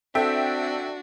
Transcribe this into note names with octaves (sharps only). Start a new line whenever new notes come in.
C4 D4 F#4 A4 E5 G5